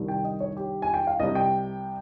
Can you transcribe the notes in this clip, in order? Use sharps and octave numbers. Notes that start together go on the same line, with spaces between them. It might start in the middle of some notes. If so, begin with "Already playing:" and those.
Already playing: C2 C3 D#3 G3
G5
D#5
C#5
G4
G#5
G5
F5
C2 C3 G3 D#5
G5